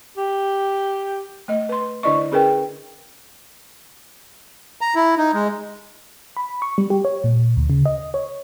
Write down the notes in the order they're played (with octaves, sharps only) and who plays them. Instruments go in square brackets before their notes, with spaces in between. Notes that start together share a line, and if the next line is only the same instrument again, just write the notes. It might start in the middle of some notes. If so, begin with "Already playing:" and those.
[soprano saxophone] G4
[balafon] A3 D#5
B4 C6
D3 D4 E4 D5 D#5 C#6
C#4 G#4 A#4 B4 G5
[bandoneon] A#5
E4
D#4
G#3
[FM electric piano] B5
C#6
G3
G4
C#5
A#2
D2
C#3
D#5
C#5